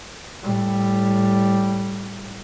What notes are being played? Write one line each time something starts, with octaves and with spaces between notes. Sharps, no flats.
A2 G3